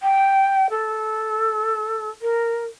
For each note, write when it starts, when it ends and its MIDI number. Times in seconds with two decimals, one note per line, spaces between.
0.01 0.66 79
0.70 2.10 69
2.21 2.64 70